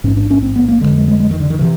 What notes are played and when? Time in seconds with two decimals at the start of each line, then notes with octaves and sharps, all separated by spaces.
0.04 A1 G#2 C#4
0.17 D4
0.31 C#4
0.42 C4
0.56 B3
0.68 A#3
0.81 F1 D#2 D3 G#3
0.95 G#3
1.08 G#3
1.20 G#3
1.31 D#3
1.40 D3
1.50 D#3
1.59 C3 E3